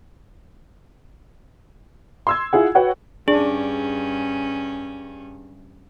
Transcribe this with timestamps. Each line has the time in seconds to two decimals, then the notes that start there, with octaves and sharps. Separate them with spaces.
2.27 C6 E6 G#6
2.53 E4 F4 G#4 F#5
2.75 F#4 B4 C#5 F#5 G5
3.28 G2 C#4 D4 G#4